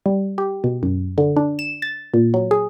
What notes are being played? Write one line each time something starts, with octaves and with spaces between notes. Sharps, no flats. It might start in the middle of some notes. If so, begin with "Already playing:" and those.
G3
G4
B2
F#2
D3
D4
E7
A6
A#2
F#3
G#4